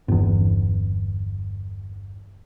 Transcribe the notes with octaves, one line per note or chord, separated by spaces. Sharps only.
G1 E2